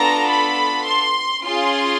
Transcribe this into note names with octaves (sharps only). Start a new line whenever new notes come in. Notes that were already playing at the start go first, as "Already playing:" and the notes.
Already playing: B3 D4 F4 A4 A#5
B5
C6
C#4 F4 G#4 C6